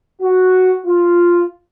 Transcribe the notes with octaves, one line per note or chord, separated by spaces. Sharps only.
F#4
F4